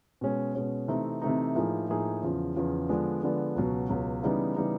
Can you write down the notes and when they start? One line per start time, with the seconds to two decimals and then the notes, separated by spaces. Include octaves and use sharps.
0.21 B2 G#3 C#4
0.55 B2 G#3 C#4
0.88 C3 E3 A3 C4 D#4
1.22 C3 E3 A3 C4 D#4
1.55 A2 F3 A#3 D#4 G#4
1.89 A2 F3 A#3 D#4 G#4
2.23 E2 C#3 F3
2.56 E2 C#3 F3
2.89 D3 F3 G#3 B3 D4
3.23 D3 F3 G#3 B3 D4
3.56 C#2 B2 F#3
3.89 C#2 B2 F#3
4.23 C#3 E3 G3 B3 D#4
4.56 C#3 E3 G3 B3 D#4